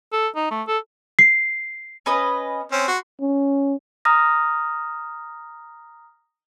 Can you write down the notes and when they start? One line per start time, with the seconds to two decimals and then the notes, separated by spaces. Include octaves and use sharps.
0.13 A4
0.36 D#4
0.51 A3
0.67 A4
1.19 C7
2.06 C#4 B4 D#5
2.72 C4 C#4
2.88 F#4 C6
3.21 C#4
4.05 A#5 D#6 F6 A#6